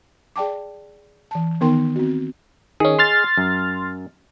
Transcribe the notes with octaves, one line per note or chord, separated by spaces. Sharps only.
G#4 D5 G5 A5 D6
E3 A5
D#3 B3 D#4 A#4 G5 C6
C4 F#4
D#3 C#4 G#4 D#5
C6 F6 A6
F#2